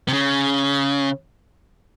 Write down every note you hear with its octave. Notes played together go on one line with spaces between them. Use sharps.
C3
C#3